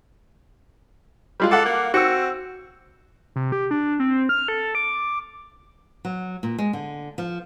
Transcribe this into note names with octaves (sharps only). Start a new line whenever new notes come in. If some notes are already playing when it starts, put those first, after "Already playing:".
G3 G#3 F4
A4 F5 F#5 D6
A#3
C4 F#4 E6 C#7
C3
G4
D4
C4
F6
A4
D6
F#3
A#2
G#3
D3
F3